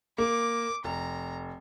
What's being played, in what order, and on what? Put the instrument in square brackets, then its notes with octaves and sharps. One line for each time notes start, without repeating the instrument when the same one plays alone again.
[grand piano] A#3 [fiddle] D6
[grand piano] F1 [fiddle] A#5